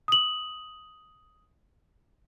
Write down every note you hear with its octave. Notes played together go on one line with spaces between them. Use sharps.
D#6 F#7